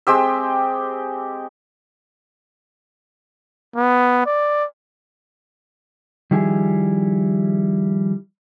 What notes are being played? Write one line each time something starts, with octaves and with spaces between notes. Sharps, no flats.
G#3 C4 G4 E6
B3
D5
D#3 F3 G3 E4 G#4